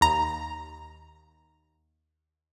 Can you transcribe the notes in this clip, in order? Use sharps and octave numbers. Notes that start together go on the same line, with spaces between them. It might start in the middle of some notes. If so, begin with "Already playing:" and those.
D#2 A#5